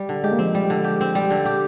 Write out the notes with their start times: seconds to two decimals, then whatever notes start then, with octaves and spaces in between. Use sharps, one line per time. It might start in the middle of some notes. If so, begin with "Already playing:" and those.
Already playing: G3
0.09 D3
0.24 G#3 G4
0.32 A#3
0.39 F3 G#3 C4
0.55 G3
0.70 D3
0.84 G4
1.01 C4
1.15 G3
1.30 D3
1.45 G4